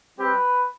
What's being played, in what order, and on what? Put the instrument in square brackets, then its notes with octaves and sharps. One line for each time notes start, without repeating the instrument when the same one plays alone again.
[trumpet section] G3 C4 G4 B4